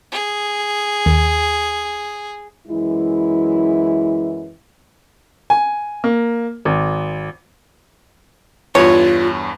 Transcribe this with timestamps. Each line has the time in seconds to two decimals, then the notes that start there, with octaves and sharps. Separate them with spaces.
0.12 G#4
1.06 D#2
2.68 F#2 E3 G#3 E4
5.50 G#5
6.04 A#3
6.65 G#1
8.75 E2 G2 F4 C#5